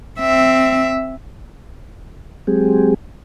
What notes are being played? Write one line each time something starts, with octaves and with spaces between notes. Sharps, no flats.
C4 E5
F#3 G#3 C4 G4 G#4